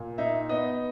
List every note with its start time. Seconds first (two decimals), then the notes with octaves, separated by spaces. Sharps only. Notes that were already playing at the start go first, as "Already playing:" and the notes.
Already playing: A#2
0.18 D#4 E5
0.49 B3 D#5